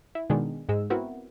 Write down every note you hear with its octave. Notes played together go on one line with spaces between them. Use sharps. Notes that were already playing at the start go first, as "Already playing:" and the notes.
E4
B2 D#3 G#3 D4 G#4
G#2 G#3 E6
B3 C4 E4 F#4 A#4 B4